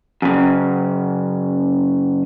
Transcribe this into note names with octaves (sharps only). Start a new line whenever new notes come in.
F#2 C#3